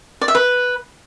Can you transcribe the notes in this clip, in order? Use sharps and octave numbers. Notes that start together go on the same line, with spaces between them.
D5
E5
B4